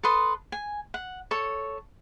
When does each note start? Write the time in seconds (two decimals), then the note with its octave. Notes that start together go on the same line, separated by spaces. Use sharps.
0.03 A4 B4 C6 D#6
0.52 G#5
0.94 F#5
1.31 A4 C#5